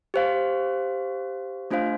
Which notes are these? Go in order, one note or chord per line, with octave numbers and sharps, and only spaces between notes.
G4 C5 F5
A3 D4 F4 C5 F5